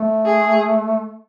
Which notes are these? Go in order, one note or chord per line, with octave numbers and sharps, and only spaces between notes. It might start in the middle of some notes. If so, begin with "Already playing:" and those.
Already playing: A3
G#4